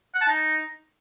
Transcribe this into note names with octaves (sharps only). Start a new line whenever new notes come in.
F#5
A5
D#4